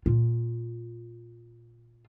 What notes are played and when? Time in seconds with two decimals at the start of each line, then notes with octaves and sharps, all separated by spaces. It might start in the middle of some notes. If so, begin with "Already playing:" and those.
0.06 A#2 F4